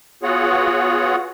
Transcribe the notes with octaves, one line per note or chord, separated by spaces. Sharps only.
B3 F4 F#4 G#4 C#5 F#5